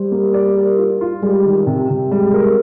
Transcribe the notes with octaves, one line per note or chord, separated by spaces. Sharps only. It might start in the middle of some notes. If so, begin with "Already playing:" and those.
Already playing: G3 C5
A#3
D5
A#4
F4
F4
G3 G#3
D#3
C3
C3
G3 G#3
A#4